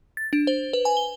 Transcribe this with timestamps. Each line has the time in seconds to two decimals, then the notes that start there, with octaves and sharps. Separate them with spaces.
0.17 A6
0.33 D4
0.47 C5
0.73 B4
0.85 G#5
0.97 G7